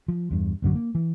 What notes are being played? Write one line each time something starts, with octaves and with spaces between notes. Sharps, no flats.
F3
E2 G2
A1 F#2 D3 F#3
A#3
E3